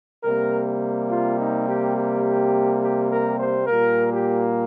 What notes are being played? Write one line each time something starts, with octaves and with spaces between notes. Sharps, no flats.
C3 G3 A#3 A#4
F4
D#4
G4
G4
G4
A#4
C5
A#2 G3 A#3 A#4
G4